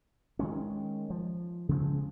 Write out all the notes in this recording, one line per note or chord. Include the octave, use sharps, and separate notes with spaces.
D#3 G#3 C#4
F3
C#3 F3 G#3 C4